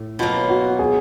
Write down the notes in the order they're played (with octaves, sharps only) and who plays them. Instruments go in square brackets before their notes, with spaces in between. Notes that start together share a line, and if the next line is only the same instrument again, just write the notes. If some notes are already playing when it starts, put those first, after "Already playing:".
Already playing: [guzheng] A2
[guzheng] B2 F#3 A#3 [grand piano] F4
[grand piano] F#4
G#4